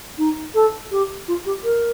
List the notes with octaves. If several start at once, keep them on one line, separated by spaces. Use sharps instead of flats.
D#4
A4
G4
F4
G4
A#4